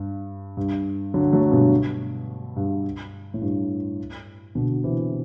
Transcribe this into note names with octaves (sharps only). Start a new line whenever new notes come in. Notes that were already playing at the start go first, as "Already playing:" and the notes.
Already playing: G2
G2
D3 F#3
F#3 A3
G2 B2
G2
A2
G2
B2 D3
C3 E3